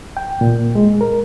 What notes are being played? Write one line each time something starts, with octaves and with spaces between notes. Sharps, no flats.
G5
A#2
G#3
A#4